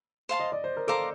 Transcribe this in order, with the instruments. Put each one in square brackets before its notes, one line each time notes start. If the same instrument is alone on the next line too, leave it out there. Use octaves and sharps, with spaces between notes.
[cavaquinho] C5 F5 A5 C6
[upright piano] D#5
D5
C5
A#4
[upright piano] A4 [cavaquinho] C5 F5 A#5 D6